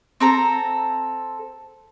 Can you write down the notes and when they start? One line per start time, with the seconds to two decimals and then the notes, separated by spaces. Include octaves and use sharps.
0.20 C4 A4 A#5